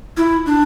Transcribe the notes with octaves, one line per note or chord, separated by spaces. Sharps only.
E4
D4